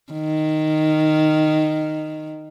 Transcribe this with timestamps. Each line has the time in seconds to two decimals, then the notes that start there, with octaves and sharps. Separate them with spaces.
0.12 D#3